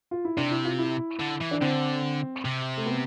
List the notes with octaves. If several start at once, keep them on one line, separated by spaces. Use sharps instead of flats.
F4
E4
C3 D4
E4
F4
E4
D3
E3
D4
D3 C4
C3
A3
B3